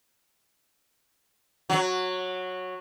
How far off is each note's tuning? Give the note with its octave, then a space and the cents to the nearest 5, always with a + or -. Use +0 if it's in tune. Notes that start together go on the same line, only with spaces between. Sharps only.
F#3 -10